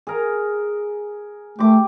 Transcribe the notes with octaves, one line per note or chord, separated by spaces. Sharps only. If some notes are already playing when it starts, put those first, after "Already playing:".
G#4 A#4 A#5
A3 G4 D6